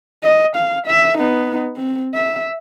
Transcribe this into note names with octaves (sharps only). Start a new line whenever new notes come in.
D#5
F5
E5
B3 D#4
C4
E5